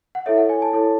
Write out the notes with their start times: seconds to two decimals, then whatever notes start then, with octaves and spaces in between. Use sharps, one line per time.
0.15 F#5
0.26 E4 A4 C#5 E5
0.37 F#5
0.49 G#5
0.62 A5
0.73 E4 A4 C#5